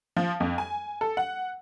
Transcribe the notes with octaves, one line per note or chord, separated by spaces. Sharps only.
F3
F2
G#5
A4
F#5